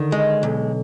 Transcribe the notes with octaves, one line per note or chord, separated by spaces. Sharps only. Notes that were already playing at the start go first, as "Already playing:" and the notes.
Already playing: D3 D#3
G#3
B1